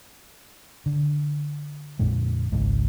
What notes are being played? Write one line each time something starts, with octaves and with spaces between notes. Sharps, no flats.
D3
A#1 F2 A#2 G#3
G#1 C#2 G#2